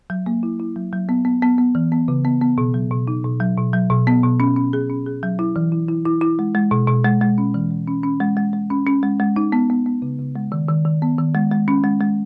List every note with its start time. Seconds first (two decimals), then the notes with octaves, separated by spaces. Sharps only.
0.10 F#3
0.26 A#3
0.43 E4
0.60 E4
0.76 F#3
0.93 F#3
1.09 B3
1.25 B3
1.42 B3
1.58 B3
1.75 E3
1.92 B3
2.08 C#3
2.25 B3
2.41 B3
2.58 B2
2.74 F#3
2.91 B2
3.07 D#4
3.24 B2
3.40 F#3
3.57 B2
3.73 F#3
3.90 B2
4.07 B3
4.24 B2
4.40 C#4
4.56 C#4
4.73 G#4
4.90 C#4
5.06 G#4
5.23 F#3
5.39 E4
5.56 E3
5.72 E4
5.88 E4
6.05 E4
6.21 E4
6.39 G#3
6.55 G#3
6.71 B2
6.88 B2
7.04 G#3
7.22 G#3
7.38 C#4
7.54 E3
7.71 G#3
7.87 C#4
8.04 C#4
8.20 G#3
8.37 G#3
8.53 G#3
8.70 C#4
8.87 C#4
9.03 G#3
9.20 G#3
9.36 D#4
9.52 B3
9.70 B3
9.86 B3
10.02 C#3
10.19 C#3
10.36 G#3
10.52 D#3
10.68 D#3
10.85 D#3
11.02 B3
11.18 D#3
11.35 G#3
11.52 G#3
11.68 C#4
11.84 G#3
12.01 G#3